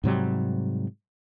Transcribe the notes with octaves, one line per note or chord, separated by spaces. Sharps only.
G#2 C3 F#3 G3